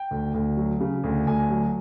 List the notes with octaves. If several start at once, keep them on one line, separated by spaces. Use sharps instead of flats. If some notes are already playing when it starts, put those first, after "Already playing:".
Already playing: G5
D2
D2
F#3
C#3
D2
D2 G#5
F#3